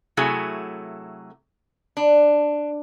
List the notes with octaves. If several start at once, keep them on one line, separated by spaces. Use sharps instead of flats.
C3 F#3 A3 E4 G#4
D4